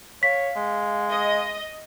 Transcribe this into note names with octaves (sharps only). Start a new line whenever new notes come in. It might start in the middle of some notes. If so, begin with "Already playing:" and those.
C#5 F5 B6
G#3
D#5